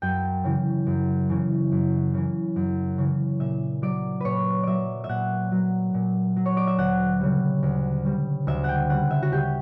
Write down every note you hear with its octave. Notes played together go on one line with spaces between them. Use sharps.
F#2 G5
C#3 E3
F#2
C#3 E3
F#2
C#3 E3
F#2
C#3 E3
A#2 E5
F#3 D5
A#2 B4 C#5
F#3 D5 E5
E5
A#2 F#5
F#3
A#2
F#3
C#5
D5
E5
D2 F#5
C#3 G3
D2
C#3 G3
D2 E5
F#5 G5
C#3 G3 F#5
E5
F#4
D2 G4